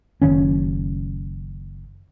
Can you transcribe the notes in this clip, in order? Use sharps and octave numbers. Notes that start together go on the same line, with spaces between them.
F#1 C2 D#3 C#4